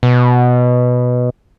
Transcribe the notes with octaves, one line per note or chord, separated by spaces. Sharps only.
B2